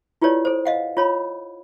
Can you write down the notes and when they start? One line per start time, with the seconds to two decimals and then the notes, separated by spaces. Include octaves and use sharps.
0.22 E4 F4 G4 B4 C#5 D5
0.45 A4 C5
0.65 D#5 F5 F#5
0.97 F4 C#5 B5